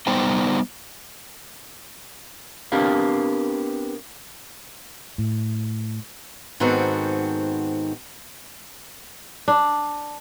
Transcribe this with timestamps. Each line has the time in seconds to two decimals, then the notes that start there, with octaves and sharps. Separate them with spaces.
0.07 G3 B3 D#4 C5 D5 G5
2.72 B3 C4 D4 G4 A#4 F5
5.18 A2
6.60 G#2 D#3 B3 C4 F#4 A4
9.48 D4